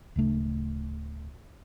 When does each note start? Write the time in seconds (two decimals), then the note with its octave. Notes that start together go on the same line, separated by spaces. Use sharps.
0.16 D1 C#3 A3 D4